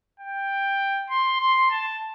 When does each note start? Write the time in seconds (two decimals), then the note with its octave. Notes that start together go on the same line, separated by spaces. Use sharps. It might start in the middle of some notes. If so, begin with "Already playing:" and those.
0.20 G5
1.10 C6
1.40 C6
1.71 A5